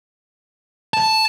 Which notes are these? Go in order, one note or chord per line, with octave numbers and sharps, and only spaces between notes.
A5